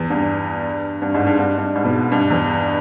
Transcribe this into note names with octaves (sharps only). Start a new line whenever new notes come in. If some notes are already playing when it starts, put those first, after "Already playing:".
Already playing: E2
G2
G2
G#2
G2
G2
G2
G#2
B2
G2
E2